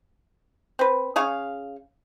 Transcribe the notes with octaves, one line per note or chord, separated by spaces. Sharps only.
C4 B4
C#3 G#4 F5 C#6